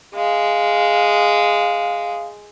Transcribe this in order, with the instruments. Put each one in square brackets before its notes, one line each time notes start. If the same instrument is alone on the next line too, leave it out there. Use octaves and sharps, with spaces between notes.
[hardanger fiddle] G#3 [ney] F5